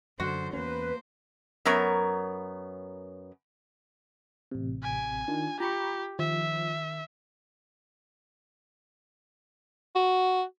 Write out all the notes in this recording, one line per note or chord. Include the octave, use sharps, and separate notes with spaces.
F#2 D3 F#4 C5
E2 A#3 C#4 B4 C5
F#2 F#3 B3 A#4 C#5
A1 C3
G#5 B6 D7
D#3 D4 F4
F4 G4 A#5 B5 C#6
D#3 F3 E5
F#4